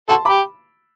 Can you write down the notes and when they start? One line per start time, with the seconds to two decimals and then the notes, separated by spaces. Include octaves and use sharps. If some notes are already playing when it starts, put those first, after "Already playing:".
0.09 F#4 A4 A5 C6
0.25 G4 B5 D6